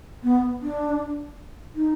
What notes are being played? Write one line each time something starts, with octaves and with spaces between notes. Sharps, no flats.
B3
D4
D#4